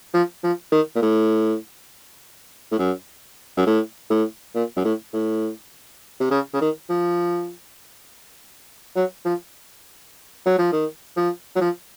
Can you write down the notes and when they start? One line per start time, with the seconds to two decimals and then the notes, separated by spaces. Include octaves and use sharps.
0.14 F3
0.43 F3
0.72 D#3
0.96 A#2
1.02 A2
2.72 A2
2.78 F#2
3.57 F#2
3.67 A2
4.10 A2
4.55 A#2
4.76 F#2
4.84 A2
5.13 A2
6.20 C3
6.31 C#3
6.53 C#3
6.61 D#3
6.89 F3
8.96 F#3
9.25 F3
10.46 F#3
10.58 F3
10.72 D#3
11.16 F3
11.56 F#3
11.61 F3